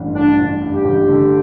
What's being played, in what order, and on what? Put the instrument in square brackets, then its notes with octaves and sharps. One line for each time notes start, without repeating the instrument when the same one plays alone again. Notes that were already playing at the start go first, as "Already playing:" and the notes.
Already playing: [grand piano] A1 G2
[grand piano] A1 [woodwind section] D4
[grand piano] A1
G2
[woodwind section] G4
[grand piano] A1
D3